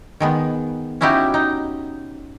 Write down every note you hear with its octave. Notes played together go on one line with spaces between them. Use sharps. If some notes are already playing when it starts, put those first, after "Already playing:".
D#3 G#3 B3
C#4 D#4 E4 F#4 G4
D#4